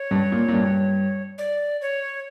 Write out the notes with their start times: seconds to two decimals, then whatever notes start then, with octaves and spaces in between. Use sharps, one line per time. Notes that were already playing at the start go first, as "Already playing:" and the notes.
Already playing: C#5
0.11 G2
0.32 A#2
0.48 A#2
0.53 G2
1.38 D5
1.81 C#5